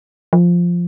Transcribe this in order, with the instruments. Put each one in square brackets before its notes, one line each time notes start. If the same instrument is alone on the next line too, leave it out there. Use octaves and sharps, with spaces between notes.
[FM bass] F3